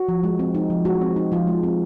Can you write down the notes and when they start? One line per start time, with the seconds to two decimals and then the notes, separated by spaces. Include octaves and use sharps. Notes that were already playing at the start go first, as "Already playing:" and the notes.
Already playing: F#4
0.08 F3
0.23 G#3
0.39 C4
0.55 D#4
0.70 F3
0.85 G#3 F#4
1.01 C4
1.16 D#4
1.32 F3 F4
1.47 G#3
1.63 C4